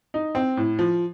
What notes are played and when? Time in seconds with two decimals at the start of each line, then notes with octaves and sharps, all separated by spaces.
0.14 D#4
0.35 C4
0.57 A2
0.79 F3